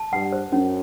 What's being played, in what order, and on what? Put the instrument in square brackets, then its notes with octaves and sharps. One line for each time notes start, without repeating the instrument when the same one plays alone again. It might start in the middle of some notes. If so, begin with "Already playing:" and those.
Already playing: [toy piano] A5
[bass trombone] G2 [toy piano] F#5
[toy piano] C5
[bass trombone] F#2 [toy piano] C#4